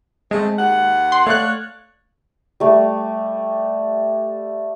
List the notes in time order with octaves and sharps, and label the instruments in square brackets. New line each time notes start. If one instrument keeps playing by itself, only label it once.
[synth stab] G#3 [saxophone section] A3 C4
[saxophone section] D#2 F#5
[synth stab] C6
[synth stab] A3 F#6 [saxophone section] C#5 D5 F5
[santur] G3 A3